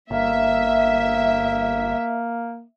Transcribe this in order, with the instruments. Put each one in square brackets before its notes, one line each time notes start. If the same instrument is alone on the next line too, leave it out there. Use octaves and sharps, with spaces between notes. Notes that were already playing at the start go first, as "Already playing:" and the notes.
[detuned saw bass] G1 [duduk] A#3 [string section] E5